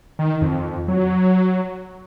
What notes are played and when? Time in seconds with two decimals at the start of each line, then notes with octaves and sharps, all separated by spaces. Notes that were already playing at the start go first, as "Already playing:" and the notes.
0.19 D#3
0.42 F2
0.88 F#3